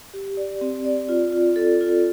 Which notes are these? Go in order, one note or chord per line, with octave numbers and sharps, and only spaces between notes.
G4
D5
C4
D5
F4
F4
A4
F4